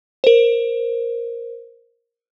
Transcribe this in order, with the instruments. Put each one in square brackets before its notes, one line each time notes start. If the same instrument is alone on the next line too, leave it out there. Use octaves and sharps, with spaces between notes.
[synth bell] A#4 C5